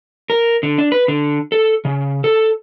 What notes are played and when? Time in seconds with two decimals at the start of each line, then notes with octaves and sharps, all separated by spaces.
0.30 A#4
0.63 D3
0.78 D4
0.92 B4
1.08 D3
1.52 A4
1.85 C#3
2.24 A4